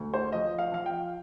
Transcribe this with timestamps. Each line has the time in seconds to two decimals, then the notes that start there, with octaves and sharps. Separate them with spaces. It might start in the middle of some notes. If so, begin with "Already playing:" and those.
Already playing: D2
0.14 C5
0.32 F3 D#5
0.58 F5
0.72 F3 F5
0.86 G5